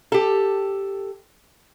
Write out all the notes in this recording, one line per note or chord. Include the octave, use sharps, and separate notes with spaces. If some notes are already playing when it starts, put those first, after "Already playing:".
G4 A4